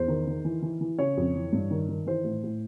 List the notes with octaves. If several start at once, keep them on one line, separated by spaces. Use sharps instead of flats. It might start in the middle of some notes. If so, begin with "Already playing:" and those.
Already playing: E2 C5
D#3
D#3
E3
E3
E3
C#3 C#5
F2
E3
G2
D#3
D#3
E3 C5
A2
A2